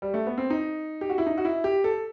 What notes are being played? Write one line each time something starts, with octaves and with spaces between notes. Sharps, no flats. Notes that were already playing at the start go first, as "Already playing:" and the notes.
G3
A3
B3
C4
D#4
G4
F#4
E4
D#4
F#4
E4
G4
A4